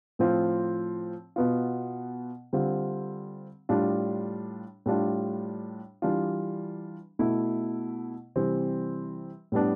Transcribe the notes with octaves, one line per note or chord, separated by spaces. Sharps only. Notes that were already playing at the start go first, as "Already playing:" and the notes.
A2 F3 C4 F4
B2 B3 F4
D3 G3 C4 F4
A2 G3 D4 F4
A2 G3 D4 F4
E3 G3 D4 F4
B2 A3 E4
C3 E3 G3 C4
A2 G3 B3 D4